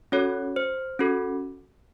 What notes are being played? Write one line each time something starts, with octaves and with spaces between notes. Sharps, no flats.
C#4 F#4 A4 C#5
C5
C#4 F#4 A4